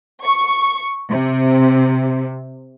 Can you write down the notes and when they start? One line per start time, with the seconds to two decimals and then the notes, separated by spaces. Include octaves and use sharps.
0.23 C#6
1.08 C3